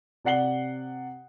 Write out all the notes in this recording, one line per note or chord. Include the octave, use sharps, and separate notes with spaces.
C3 D5 F#5 C7 F#7 G7